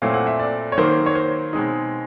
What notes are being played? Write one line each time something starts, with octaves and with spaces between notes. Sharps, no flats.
A#2 F#3 A3 C4 E4 F5
F#5
E5
D5
C#5
D#3 F#3 A#3 C5
C#5
C5
B2 G#3 C4 D#4